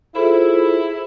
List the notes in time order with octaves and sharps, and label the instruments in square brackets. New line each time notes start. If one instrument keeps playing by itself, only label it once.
[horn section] E4 [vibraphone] F4 G#4 C5 [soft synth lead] A4